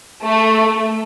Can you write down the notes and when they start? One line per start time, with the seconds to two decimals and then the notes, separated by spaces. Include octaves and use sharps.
0.23 A3